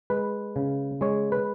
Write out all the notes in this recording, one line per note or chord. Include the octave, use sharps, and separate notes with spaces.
G#3 B4
C#3
G#3 C#5
B4